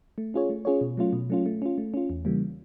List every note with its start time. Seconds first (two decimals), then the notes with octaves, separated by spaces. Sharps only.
0.18 A3
0.34 C#4 F4 G#4 C#5
0.50 A3
0.65 C#4 F4 G#4 C#5
0.81 B2
0.97 F#3 A3 C#4 F4
1.13 B2
1.29 F#3 A3 C#4 F4
1.46 A3
1.62 C#4 F4
1.78 A3
1.94 C#4 F4
2.10 E2
2.25 C#3 E3 G3 A#3